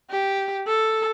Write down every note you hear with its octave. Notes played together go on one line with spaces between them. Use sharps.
G4
A4